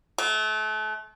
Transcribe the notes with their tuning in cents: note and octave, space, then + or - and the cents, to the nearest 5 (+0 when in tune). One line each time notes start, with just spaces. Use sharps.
A3 -35